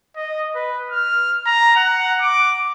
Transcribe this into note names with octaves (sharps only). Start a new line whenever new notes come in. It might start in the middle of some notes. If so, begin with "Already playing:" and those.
D#5
B4
F6
A#5
F#5
D6